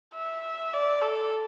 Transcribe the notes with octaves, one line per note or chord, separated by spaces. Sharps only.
E5
D5
A4